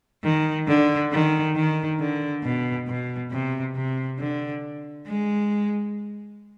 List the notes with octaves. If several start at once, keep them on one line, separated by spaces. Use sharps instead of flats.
D#3
D3
D#3
D#3
D3
B2
B2
C3
C3
D3
G#3